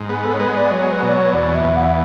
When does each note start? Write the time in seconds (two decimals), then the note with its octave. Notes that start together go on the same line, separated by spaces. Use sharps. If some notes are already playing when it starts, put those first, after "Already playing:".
Already playing: G#2
0.09 B3 G#4
0.24 A4
0.33 C#5
0.40 G#3 B4
0.55 D5
0.71 F#3 C#5
0.92 B4
1.03 B2 D5
1.13 C#5
1.33 E2 D5
1.55 E5
1.65 E2
1.76 F#5
1.83 E5